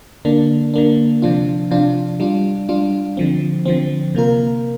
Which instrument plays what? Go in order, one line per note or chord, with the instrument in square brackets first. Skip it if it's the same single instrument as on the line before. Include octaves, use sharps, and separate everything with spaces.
[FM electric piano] D3 A#3 D4
D3 A#3 D4
C3 F3 D4 F4
C3 F3 D4 F4
G3 D4 F4
G3 D4 F4
D3 F3 C4
D3 F3 C4
C3 A#3 F4 A#4